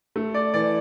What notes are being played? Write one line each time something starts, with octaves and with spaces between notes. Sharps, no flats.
A3
D5
E3 D5